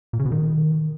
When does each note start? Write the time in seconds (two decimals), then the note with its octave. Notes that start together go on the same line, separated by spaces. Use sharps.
0.13 A#2
0.19 C#3
0.26 B2
0.32 D#3